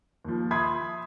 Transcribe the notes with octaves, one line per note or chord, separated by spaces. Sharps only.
D#2 F3
E5 B5 C6 D#6 G#6